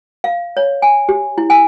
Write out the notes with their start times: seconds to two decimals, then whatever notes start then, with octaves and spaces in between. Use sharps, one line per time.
0.24 F5
0.57 C#5
0.82 G#5
1.09 G4
1.38 E4
1.50 G#5